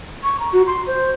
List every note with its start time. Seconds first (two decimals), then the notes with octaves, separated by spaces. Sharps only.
0.24 C#6
0.40 A#5
0.53 F#4
0.67 C6
0.87 C5